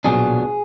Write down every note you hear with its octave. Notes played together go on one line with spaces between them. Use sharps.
B1 A#2 F#3 B3 D4 G#4